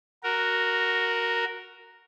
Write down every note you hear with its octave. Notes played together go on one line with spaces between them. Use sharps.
F#4 A#4